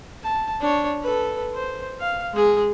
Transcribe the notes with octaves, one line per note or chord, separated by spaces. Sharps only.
A5
D4 C#5
A4 B4
C5
F5
G#3 G#4